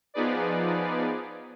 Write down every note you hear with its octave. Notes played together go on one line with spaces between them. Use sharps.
F3 B3 D#4 G#4 B4 D5